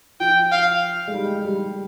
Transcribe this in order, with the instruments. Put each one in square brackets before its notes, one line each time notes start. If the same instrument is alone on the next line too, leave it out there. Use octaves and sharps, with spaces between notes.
[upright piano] F3 [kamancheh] G5
[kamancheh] F5
[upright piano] G#3
G3
G3